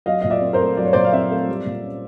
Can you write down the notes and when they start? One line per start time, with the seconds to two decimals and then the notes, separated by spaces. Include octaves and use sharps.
0.06 F#3 D#5 F5
0.22 A#2 D#5
0.30 D5 E5
0.41 C4
0.53 A#4 C5
0.60 A3
0.77 F#3 D5
0.85 C#5
0.93 A#2 C5 D5
1.05 F5
1.12 C4 D5 E5
1.31 A3
1.48 G3
1.66 A#2
1.83 C#4